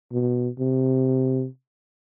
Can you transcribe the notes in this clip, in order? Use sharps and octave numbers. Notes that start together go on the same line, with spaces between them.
B2
C3